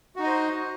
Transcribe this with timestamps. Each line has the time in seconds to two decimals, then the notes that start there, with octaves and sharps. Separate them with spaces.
0.16 F#4
0.19 D#4
0.23 D#5
0.27 C5